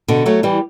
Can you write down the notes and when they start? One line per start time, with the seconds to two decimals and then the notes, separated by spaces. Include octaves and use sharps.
0.08 B2 D3
0.26 F#3 A3
0.43 E3 G3